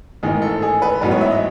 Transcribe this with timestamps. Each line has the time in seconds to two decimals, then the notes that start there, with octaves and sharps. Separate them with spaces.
0.23 A1 G#2 D#3 G#4
0.42 A4
0.62 G#4
0.82 B4
1.01 A1 G#2 F#3 B3 B4
1.11 C#5
1.21 E5
1.31 D#5